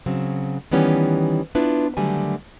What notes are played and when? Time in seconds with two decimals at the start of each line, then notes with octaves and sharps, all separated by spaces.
0.06 C#3 F#3 C4
0.71 D#3 E3 G3 B3 C#4 G4
1.55 B3 D4 E4 F4 B4
1.97 D3 D#3 F#3 G3 A3 G#5